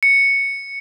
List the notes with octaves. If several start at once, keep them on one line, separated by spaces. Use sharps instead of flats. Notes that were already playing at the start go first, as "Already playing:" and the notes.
C#7